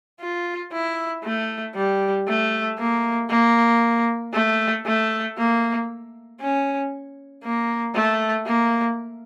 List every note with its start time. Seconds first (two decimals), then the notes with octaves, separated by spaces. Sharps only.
0.21 F4
0.72 E4
1.24 A3
1.75 G3
2.28 A3
2.79 A#3
3.30 A#3
4.34 A3
4.86 A3
5.38 A#3
6.41 C#4
7.44 A#3
7.95 A3
8.47 A#3